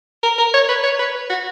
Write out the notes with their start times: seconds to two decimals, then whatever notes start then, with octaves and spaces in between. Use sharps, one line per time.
0.23 A#4
0.38 A#4
0.54 C#5
0.69 B4
0.84 C#5
0.99 B4
1.30 F#4